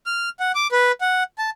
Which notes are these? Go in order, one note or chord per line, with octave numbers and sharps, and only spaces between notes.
F6
F#5
D6
B4
F#5
A5